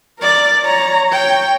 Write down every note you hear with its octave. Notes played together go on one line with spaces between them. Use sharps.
A#4 D5
C#5 A#5
C#5 G5